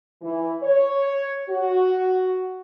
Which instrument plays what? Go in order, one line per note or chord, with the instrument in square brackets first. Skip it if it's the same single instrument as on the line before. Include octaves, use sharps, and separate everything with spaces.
[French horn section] E3
C#5
F#4